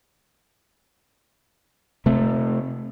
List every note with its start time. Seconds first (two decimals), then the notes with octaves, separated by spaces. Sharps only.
2.06 C3 A3